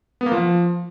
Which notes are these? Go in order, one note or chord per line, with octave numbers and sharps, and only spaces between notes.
B3
A#3
F3